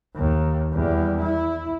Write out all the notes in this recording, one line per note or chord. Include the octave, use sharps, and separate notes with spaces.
D#2
E2 G3
E4